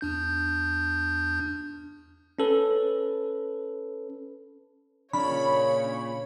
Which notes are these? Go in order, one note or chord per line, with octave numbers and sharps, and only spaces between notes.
E2 D4 G6
C#4 A4 B4
A#2 C#3 C#4 D4 C#5 B5